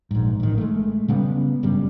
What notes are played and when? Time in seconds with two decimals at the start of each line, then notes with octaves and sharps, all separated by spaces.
0.11 A#1 G#2
0.40 A1 D#3
0.58 G#3 A3
1.08 C#3 G3 B3
1.63 F#1 G2 C#3 G3